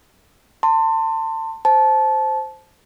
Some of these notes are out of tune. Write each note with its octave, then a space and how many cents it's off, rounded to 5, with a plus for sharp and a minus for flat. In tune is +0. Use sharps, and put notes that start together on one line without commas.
A5 +30 C6 +0
C5 +0 A5 -20